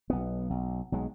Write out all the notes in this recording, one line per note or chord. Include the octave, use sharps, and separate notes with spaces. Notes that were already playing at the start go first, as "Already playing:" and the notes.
B1 B3
B1
B1 F#3 G#3